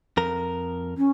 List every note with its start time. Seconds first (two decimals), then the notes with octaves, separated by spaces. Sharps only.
0.17 F2 A#4
0.97 C#4